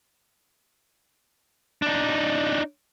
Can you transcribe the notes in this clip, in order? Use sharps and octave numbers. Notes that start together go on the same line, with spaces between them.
D4 D#4